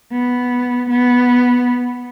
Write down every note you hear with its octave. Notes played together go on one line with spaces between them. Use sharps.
B3
B3